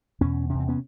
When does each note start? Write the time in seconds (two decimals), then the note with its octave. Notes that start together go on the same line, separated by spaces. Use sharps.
0.21 E2 B2 B3 C#4
0.49 E2 C3 C#4
0.60 C4
0.68 B3 C#4